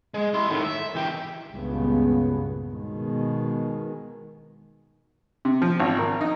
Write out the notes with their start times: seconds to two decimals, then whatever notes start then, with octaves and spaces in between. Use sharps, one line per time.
0.14 G#3
0.34 E4 C6
0.50 A2 D#3
0.65 E5
0.96 E2 G4
1.51 C#2 G2 A#2 C#3 B3
2.72 B2 D#3 G#3
5.45 C3
5.62 F3
5.80 G#1
5.99 A#4
6.21 D#4